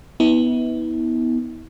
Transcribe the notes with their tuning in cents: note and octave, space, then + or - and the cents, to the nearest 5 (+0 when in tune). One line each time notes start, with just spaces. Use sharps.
B3 +0 E4 -45